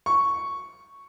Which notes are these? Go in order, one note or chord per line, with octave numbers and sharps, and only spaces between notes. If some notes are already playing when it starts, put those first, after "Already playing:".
C#6